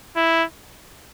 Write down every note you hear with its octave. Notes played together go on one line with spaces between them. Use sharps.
E4